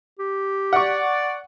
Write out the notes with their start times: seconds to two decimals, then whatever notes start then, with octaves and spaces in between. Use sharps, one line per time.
0.19 G4
0.73 D5 F#5 C#6